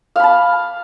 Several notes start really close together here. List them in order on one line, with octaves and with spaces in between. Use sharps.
F5 B5 A5